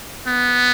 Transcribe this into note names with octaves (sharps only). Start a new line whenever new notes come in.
B3